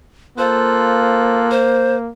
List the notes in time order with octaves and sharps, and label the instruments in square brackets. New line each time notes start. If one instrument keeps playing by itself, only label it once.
[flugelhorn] A#3 [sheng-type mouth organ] F4 A4 F#6 [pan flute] C5
[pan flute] C5